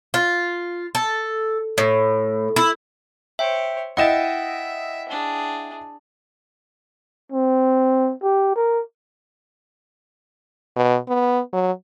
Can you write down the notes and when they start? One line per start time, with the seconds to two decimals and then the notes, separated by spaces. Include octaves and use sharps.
0.14 F4
0.95 A4
1.78 A2
2.56 E4
3.39 C5 C#5 E5 G5
3.97 E4 D#5 E5 F#5 G5 A6 E7
5.09 D4 G#4
7.32 C4
8.23 G4
8.56 A#4
10.76 B2
11.08 B3
11.53 F#3